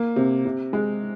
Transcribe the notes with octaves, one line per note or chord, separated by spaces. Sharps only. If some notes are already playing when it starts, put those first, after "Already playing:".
Already playing: A#3
C3
C3
G#3